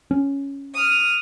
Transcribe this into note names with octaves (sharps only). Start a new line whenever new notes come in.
C#4
D#6 F6